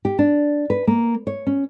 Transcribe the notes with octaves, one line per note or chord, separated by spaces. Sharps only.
G4
D4
B4
A#3
C#5
C#4